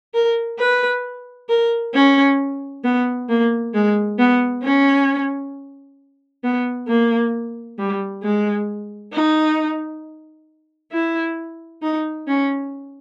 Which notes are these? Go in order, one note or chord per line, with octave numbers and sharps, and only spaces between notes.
A#4
B4
A#4
C#4
B3
A#3
G#3
B3
C#4
B3
A#3
G3
G#3
D#4
E4
D#4
C#4